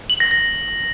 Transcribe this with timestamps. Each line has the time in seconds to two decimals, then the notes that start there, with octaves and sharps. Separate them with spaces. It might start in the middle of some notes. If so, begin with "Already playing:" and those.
0.10 F#7
0.20 A#6
0.31 A#6